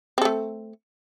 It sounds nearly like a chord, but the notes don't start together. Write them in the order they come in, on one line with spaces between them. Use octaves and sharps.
C4 A4 A3